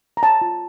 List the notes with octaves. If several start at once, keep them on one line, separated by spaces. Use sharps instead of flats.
A#5
C#5 A5
F4